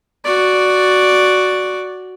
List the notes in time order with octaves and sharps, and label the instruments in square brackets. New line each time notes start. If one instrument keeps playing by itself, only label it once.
[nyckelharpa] F#4 D5